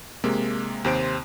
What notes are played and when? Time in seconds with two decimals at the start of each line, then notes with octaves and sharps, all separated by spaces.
0.24 C3 G#3 A#3
0.85 D#2 C3 C4 C5 C6 D7